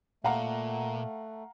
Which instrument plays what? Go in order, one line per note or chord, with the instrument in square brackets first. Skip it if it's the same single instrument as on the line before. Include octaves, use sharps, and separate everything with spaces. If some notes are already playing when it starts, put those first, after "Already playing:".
[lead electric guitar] A#2 [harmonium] A3 [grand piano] F5 F#5 A#5